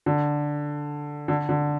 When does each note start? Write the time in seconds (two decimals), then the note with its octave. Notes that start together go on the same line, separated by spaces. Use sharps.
0.06 D3
1.28 D3
1.49 D3